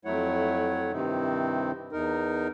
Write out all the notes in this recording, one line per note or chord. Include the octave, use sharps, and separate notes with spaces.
F2 F#3 A3 E4 C#5 F#5
G2 C3 D#3 C4 D#4 E4
E2 D#4 A#4